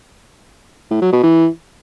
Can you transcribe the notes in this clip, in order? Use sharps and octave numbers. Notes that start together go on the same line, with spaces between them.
A2
F#3
B2
E3